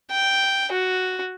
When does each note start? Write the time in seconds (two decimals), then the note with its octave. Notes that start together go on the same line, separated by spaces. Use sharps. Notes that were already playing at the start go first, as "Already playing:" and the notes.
0.11 G5
0.72 F#4